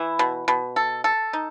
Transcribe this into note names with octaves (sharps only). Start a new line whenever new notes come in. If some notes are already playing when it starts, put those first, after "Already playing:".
Already playing: E3 E4
B2
B2
A4
A4
D#4